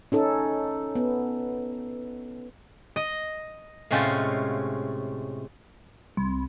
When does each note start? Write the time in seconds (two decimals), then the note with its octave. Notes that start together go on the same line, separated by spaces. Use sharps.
0.12 C#4 D#4 A4
0.95 B3
2.96 D#5
3.91 A2 C3 G#3 A3 C#4 F4
6.17 C2